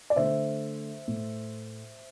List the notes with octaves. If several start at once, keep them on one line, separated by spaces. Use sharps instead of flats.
D5
D3 A3 C5 E5
A2 A3